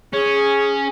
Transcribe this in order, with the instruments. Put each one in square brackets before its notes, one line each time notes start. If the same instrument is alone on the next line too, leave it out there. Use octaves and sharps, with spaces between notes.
[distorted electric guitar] C#4 [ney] G#4